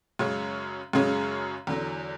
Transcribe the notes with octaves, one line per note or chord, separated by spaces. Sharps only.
F#2 C#3 G#3 C#4 G#4
F#2 C#3 G#3 C#4 G#4
E2 D3 F#3